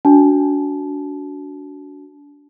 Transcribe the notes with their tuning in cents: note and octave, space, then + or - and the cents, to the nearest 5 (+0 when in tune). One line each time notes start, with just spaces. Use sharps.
D4 -30 F#4 +0 A5 -30